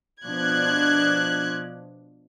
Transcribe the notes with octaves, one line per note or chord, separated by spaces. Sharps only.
B2 F3 D4 F#6 G#6